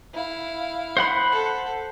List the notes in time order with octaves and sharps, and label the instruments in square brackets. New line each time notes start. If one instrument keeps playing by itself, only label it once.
[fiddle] E4 F5
[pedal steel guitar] C5 F#5 B5
[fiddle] A4